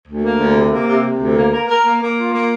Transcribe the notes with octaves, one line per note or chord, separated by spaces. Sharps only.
D2
A#3
D2
C3
A#3
C3
C3
D2
A#3
A#4
A#4
A#3
A#3
F4
A#3